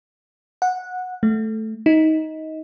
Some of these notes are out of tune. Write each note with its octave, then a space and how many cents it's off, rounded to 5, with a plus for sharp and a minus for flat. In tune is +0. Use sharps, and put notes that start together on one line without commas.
F#5 -15
A3 -5
D#4 +20